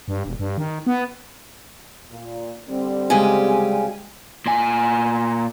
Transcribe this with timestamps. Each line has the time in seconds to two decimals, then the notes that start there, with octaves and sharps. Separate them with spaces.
0.08 G2
0.26 E1
0.39 G2
0.58 D#3
0.86 B3
2.11 A#2
2.68 D3 G3 C4
3.10 C#3 G#3 G4 G#5
4.46 A#2 G#5